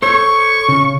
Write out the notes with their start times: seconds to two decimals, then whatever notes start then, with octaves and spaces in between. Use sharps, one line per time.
0.02 A4 C5 C#5 C#6
0.69 C#3